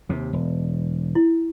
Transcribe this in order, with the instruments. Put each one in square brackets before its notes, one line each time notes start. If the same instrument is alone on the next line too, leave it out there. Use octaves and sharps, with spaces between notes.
[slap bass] D#2 C3
E1
[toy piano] E4